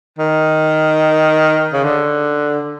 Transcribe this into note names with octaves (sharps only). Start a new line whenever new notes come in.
D#3
C#3
D3